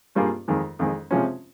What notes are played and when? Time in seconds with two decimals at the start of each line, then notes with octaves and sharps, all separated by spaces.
0.15 G2 G3 A#3 F4 G#4
0.48 F2 D#3 G#3
0.79 F2 D#3 G#3
1.11 C3 F3 G#3 C#4